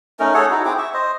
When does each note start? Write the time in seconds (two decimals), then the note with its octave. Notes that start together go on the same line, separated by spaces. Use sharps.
0.19 A3 C#4 D#4 A#4
0.34 G#4 A4 C#5 F#5
0.51 D#4 E4 F#4
0.65 C4 E4 G#4 D6
0.78 E5 C#6
0.94 C5 D#5